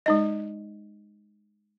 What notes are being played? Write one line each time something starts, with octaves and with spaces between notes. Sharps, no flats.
G#3 D#4 D#5